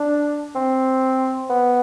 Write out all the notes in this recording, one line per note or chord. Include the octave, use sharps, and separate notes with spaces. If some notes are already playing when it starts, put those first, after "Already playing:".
Already playing: D4
C4
B3